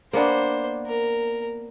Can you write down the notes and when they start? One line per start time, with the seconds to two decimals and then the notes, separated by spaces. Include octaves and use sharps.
0.13 A#3 B3 D4 C5
0.86 A#4